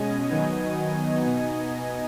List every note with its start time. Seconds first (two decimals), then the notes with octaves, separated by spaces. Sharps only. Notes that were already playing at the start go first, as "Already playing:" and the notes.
Already playing: B2 G#3 C#4 D#5 G#5
0.29 D#3 F#3 B3 D#4
1.22 B2 B3 D#4